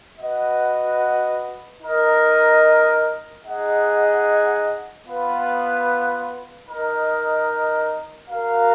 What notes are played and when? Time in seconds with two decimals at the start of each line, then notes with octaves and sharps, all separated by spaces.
0.18 F#4 B4 D#5 F#5
1.80 D#4 A#4 D#5
3.42 D#4 G#4 D#5 F#5
5.05 B3 F4 B4
6.67 D#4 A#4 D#5
8.29 F#4 A#4 F5